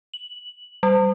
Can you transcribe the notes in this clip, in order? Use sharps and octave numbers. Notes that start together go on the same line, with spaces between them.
F#7
G3